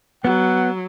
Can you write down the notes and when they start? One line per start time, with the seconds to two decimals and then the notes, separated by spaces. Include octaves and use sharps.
0.25 F#3 B3 F#5